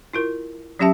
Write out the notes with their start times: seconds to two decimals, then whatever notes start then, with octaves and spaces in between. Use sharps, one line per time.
0.13 E4 F4 A#4
0.79 F#3 C#4 G4 E5 A5